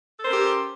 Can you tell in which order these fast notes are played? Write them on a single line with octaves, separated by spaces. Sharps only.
A4 C5 A#4 C#4 G4